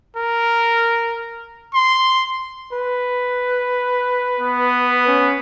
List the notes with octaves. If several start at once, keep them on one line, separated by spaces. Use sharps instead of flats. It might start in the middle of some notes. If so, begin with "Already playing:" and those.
A#4
C6
B4
B3
C#4